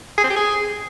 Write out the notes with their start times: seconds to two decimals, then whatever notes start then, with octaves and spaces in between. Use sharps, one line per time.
0.18 G#4
0.24 C4
0.30 G4
0.36 G#4